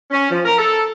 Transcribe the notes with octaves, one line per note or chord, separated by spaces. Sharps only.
C#4
F3
A#4
A4